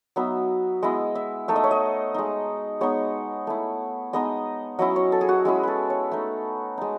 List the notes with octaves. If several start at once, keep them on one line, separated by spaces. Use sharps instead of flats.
F#3 B3 D#4 E5
G#3 B3 E4 D#5
E5
A3 D#4 E5
D#5
C#5
D#5
G#3 D#4
G#3 B3 D#4 C#5
A3 E4
G#3 B3 D#4 D#5
F#3 C#4 E4 D#5
C#5
A4
G#4
F#4
G#3 C#4 E4 G#4
A4 B4
C#5
A3 D#4
G#3 D#4